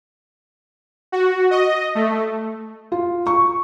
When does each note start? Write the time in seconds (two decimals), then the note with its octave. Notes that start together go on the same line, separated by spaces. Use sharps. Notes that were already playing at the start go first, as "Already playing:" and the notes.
1.12 F#4
1.51 D#5
1.95 A3
2.92 F4
3.27 C#6